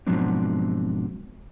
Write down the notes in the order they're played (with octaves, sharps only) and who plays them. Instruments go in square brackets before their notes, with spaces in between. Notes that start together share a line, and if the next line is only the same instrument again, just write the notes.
[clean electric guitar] G#2 B2 F3 F#3 C4 D4